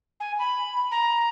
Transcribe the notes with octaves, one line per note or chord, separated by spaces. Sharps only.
G#5
B5
A#5